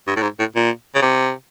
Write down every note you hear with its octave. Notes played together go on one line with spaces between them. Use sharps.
G2
A2
G#2
A2
A#2
C#3
C3